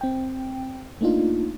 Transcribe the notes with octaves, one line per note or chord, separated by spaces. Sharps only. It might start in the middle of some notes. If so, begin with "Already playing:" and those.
C4 G5
A3 A#3 D4 D#4 F4